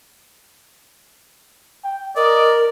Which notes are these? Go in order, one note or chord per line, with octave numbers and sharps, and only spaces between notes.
G5
A#4 D5 D#5